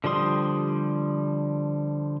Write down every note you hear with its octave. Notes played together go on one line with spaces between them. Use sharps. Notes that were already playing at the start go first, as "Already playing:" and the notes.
D3 F3 G3 C6 D#6